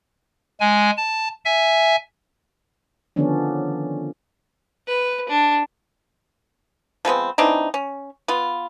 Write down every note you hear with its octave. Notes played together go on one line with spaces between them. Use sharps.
G#3 G#5
A5
E5 G#5
D3 D#3 F3 B3 C#4 D4
B4
D4
F3 G#3 B3 C4
E3 C4 D4 D#4
C#4
B3 F4